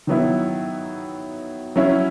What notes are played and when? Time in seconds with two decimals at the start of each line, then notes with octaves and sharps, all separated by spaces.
0.07 D#3 F#3 B3 E4
1.76 F#3 C#4 E4